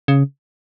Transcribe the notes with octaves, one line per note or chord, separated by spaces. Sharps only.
C#3